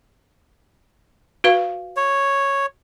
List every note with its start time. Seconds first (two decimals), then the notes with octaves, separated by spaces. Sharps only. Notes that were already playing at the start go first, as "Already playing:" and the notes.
1.44 F#4 B4 F5
1.97 C#5